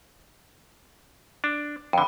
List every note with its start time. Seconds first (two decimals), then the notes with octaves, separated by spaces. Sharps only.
1.44 D4
1.93 F2 D3 G5 B5